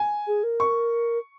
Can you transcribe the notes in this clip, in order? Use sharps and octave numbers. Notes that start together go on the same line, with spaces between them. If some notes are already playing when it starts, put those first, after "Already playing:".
Already playing: G#5
G#4
A#4
C#6